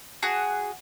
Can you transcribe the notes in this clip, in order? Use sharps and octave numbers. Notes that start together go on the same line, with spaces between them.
F#4 G#4 F#6